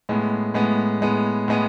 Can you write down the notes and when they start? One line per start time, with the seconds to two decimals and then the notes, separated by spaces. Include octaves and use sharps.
0.09 A2 G#3 B3
0.54 A2 G#3 B3
1.02 A2 G#3 B3
1.48 A2 G#3 B3